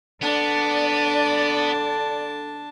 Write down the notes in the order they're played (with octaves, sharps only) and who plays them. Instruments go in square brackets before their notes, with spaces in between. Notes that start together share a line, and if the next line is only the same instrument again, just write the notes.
[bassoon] D3 [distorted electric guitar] B3 [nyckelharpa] D4 A5 [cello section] D5